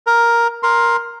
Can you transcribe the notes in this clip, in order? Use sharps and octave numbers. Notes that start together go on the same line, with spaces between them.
A#4
A#4 C6